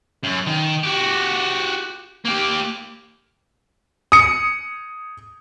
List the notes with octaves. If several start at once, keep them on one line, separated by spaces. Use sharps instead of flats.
F#2
D#3
F#4 G4
A#3 G4
D#6 C#7